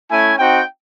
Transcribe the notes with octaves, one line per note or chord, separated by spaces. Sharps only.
A3 C#4 E4 G#5
C4 D#4 F#4 G5